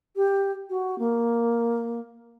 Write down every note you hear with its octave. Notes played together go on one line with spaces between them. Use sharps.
G4
F#4
A#3